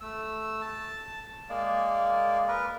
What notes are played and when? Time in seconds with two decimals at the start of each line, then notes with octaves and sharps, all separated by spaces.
0.01 A3 E6
0.62 A5
1.49 G#3 A#3 D5
2.48 A#4 B4